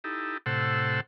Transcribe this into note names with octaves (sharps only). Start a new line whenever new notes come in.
D#4 E4 G4 A4
A2 C3 A4 C5 F#5 E6